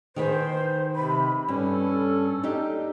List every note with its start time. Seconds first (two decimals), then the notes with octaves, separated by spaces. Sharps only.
0.16 D#3 G#4 B4 C5
0.95 C3 B5
1.48 G2 C#4 A4
2.43 D4 D#4 G4